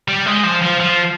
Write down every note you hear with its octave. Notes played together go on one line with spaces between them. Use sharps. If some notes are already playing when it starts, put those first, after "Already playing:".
G3
G#3
F3
F3
F3